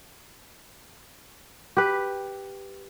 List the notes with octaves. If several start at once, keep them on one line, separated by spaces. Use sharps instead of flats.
G4 B4